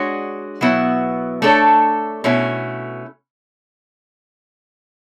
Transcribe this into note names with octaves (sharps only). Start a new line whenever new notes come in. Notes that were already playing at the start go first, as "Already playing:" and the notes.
Already playing: G#3 D4 F#4 C#5
B2 F#3 B3 E4
A3 D4 A4 C#5
B2 A3 C#4 E4